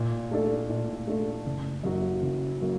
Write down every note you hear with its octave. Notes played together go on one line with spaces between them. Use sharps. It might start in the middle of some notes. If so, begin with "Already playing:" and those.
Already playing: A#2
A3 D4 A4
A#2
A3 D4 A4
F#1
F#2 F#3 A#3 F#4
F#1
F#3 A#3